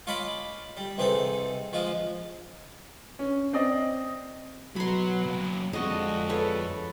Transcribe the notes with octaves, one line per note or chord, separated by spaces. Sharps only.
F4 C#5 D#5 G#5 B5 D6
G3
C2 E3 C4 D#4 G#4 A4
F3 G#3 F4
C#4
C4 D5 D#5
B2 F#3 F#4 B5 C6
F#3 A#3
F2 D3 F3 G#3 F#4 D#5
A4 B4 C#5